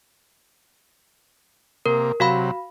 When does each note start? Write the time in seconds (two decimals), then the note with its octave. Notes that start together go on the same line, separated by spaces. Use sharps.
1.86 C3 A#3 A#4
2.20 C3 F#3 F#4 F5 B5